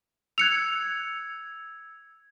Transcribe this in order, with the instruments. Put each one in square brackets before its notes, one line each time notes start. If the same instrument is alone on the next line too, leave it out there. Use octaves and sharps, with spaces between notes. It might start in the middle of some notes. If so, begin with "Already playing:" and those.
[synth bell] E6 G#6 [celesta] F#6 C#7 F7